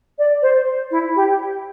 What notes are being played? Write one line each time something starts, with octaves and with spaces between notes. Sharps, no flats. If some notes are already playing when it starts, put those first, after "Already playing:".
D5
C5
E4
G4